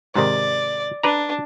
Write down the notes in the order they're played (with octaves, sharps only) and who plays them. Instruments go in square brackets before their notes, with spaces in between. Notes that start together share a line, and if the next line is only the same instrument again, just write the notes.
[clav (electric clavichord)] G#2 C3 D#3 [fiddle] D5
[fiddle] D4 [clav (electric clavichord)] B4 D5 A#5